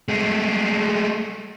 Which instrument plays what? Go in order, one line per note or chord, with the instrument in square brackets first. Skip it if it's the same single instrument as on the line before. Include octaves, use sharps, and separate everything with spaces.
[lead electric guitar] G#3 A3